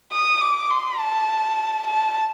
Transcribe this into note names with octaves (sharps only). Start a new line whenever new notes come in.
D#6
D6
C6
A5
A5